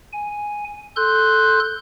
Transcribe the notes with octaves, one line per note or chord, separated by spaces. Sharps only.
G#5
A4 C6 F#6 G6